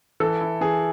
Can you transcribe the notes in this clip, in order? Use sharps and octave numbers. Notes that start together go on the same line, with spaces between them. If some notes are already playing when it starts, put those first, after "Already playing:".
E3 A4
E4
E3 G#4